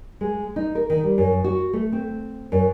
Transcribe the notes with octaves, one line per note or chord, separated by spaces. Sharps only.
G#3
D#4
A#4
D#3
G3
F#2
F#4
A3
C4
F#2